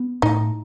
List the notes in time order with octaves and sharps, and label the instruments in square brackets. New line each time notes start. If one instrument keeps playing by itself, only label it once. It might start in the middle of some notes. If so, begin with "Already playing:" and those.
Already playing: [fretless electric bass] B3
[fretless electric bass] A2 [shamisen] D#4